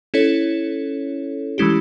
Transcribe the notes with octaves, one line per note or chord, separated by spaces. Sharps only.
C#4 E4 A4 C#5
E3 G#3 C#4 E4 G4